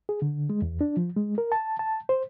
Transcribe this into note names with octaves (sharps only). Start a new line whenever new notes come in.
G#4
D3
G#3
E2
D4
F3
G#3
A#4
A5
A5
C5